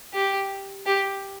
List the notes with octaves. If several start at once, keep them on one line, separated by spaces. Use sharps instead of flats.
G4
G4